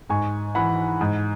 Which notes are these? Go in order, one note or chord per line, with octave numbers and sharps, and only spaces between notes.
G#2 G#5 C#6
E3 F#5 B5
G#2